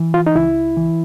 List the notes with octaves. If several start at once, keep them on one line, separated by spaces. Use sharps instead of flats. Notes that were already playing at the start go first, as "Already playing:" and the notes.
Already playing: E3
F4
D#4
C#2 E4
E3